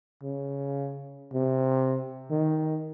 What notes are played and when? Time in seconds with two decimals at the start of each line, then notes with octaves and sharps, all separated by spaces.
0.23 C#3
1.33 C3
2.30 D#3